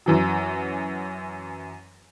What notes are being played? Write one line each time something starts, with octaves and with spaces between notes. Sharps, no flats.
F#2 E3 F#3